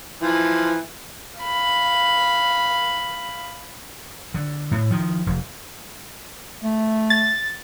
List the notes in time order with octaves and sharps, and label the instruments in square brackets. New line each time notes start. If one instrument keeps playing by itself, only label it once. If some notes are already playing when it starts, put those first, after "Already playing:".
[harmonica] E3 F3
[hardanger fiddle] F5 B5
[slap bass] D3
A2
D#3 F3
F1
[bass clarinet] A3
[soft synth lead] A6